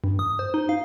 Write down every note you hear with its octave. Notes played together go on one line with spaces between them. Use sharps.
G2
D#6
C5
D#4
F5